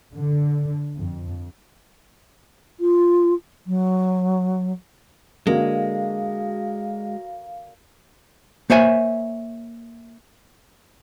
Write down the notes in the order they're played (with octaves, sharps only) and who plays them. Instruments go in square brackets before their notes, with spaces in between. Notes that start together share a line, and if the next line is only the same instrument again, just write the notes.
[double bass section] D3
F2
[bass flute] F4
F#3
[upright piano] D3 A#3 [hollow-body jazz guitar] G#3 [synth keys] F#4 A#6 [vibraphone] F5
[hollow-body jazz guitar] A#3 C5 C#5 E5 G#5